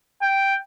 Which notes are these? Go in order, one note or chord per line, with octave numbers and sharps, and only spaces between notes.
G5